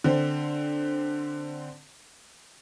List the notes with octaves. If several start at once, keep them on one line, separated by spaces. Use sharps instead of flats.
D3 C4